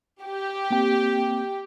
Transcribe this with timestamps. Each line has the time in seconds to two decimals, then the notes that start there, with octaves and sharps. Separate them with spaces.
0.23 G4
0.71 A#3 C4 G5